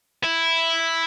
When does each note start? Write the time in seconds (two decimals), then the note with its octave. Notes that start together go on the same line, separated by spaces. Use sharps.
0.24 E4